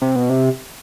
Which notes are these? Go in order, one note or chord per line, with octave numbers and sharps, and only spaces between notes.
C3
B2
C3